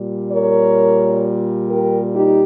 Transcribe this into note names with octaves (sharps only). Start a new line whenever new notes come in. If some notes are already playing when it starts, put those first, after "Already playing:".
Already playing: A#2 G3
A#4 C#5
G4 A#4
D#4 G4